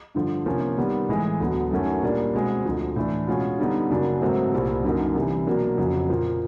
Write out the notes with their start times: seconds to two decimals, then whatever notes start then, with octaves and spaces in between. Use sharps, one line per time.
0.15 G2 D3 F3
0.46 C3 F3 A#3 C#4
0.78 D#3 G3 B3
1.09 A2 E3 G#3
1.40 D2 D3 F#3 B3
1.71 F#2 D#3 F#3 A3 C#4
2.02 A#2 G3 A#3 D4
2.34 B2 G#3 C4
2.65 D2 D3 F3
2.96 A2 E3 A3 D4
3.27 B2 G#3 C#4 F4
3.59 D3 G3 B3 D#4
3.90 F#2 C#3 F#3 A#3 D4
4.22 G#2 D#3 F#3 A3 C4
4.53 C2 A#2 G3 C4
4.84 F#2 D3 F#3 A#3 D#4
5.15 C3 E3 G3
5.47 B2 F#3 A#3 D4
5.78 F2 C#3 F#3
6.09 A#2 F3 A#3